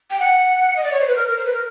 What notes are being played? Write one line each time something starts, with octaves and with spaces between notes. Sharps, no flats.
G5
F#5
D#5
D5
C#5
C5
B4
A#4
A#4
C5
B4
A#4